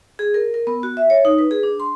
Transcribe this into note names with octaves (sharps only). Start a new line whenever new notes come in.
G#4
A#4
A#4
B3
F#4
E5
C#5
D#4
B4
G#4
D4
C6